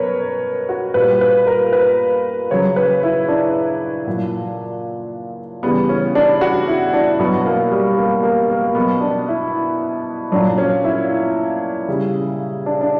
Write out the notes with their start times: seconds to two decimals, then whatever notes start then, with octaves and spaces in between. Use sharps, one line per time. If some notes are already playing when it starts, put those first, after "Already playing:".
Already playing: B2 F#3 A#4 B4 C#5
0.69 F#4
0.94 A#2 G3 B4
1.21 B4
1.47 A#4
1.73 B4
2.51 C#3 F#3 C#5
2.76 B4
3.03 E4
3.28 D4
4.07 A#2 F#3
5.63 C#3 E3 G3 B3
5.89 C#4
6.15 D4
6.41 F#4
6.67 E4
6.94 D4
7.19 B2 F#3 B3
7.45 A#3
7.71 G3
7.98 A#3
8.23 A#3
8.50 A#3
8.75 B2 F#3 B3
9.01 D4
9.28 E4
10.32 A#2 F#3 D4
10.58 C#4
10.84 E4
11.88 C#3 G3
12.66 D4
12.81 D4